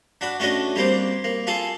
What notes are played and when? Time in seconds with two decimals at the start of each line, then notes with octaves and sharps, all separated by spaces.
0.21 D4 F#4 B5
0.40 A3 C#4 D4 F#4 D#5
0.76 G3 A#3 C4 C5
1.24 A#3
1.47 F4 G#4 A4 A5 C6